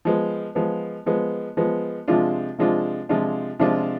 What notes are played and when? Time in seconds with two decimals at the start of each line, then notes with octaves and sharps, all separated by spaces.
0.05 F3 G#3 B3
0.55 F3 G#3 B3
1.06 F3 G#3 B3
1.57 F3 G#3 B3
2.08 C3 F3 G#3 D4 F4
2.58 C3 F3 G#3 D4 F4
3.09 C3 F3 G#3 D4 F4
3.59 C3 F3 G#3 D4 F4